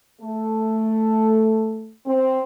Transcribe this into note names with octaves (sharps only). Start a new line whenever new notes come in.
A3
C4